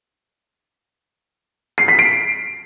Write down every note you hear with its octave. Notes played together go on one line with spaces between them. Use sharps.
C7
B6
D7